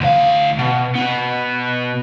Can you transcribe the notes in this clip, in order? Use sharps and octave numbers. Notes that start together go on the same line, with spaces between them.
D2 F5
B2
B2 B3